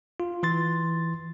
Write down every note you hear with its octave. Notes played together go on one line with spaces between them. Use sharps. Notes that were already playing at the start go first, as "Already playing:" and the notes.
F4
E3 C6 A6